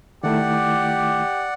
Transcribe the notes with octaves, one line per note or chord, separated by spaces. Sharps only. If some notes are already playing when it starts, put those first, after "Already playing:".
D#3 A3 E4 G4 D5 F#5